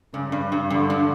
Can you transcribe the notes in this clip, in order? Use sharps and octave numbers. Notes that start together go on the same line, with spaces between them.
G2 C#3
G2
G2
G2 D3
G2